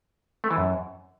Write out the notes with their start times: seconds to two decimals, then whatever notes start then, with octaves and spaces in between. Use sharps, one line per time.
0.44 A3
0.51 E3
0.57 F#2